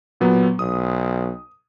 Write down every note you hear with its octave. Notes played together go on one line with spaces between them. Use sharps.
A#2 F#3 B3
B1 D#6